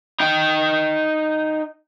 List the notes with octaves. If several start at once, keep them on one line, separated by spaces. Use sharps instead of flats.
D#4 G5